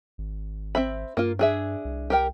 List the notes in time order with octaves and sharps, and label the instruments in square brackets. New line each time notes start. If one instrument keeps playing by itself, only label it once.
[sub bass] G#1
[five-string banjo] C4 E5 B5
[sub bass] G2 [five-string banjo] A#3 F4
[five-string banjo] D4 G#4 E5
[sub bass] C2
[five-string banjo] G4 A#4 G5